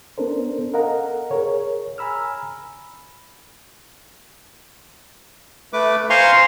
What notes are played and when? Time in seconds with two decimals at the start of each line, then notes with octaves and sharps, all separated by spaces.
0.18 B3 C#4 D4 A4 A#4 C5
0.73 A4 A#4 D#5 F5 F#5 A#5
1.31 G#4 A#4 C#5
1.98 G#5 A#5 B5 E6 F6
5.73 A3 B4 D6
6.10 C5 F5 G#5 A#5 C6 C#6